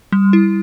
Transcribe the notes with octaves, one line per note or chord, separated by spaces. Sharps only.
G3
E4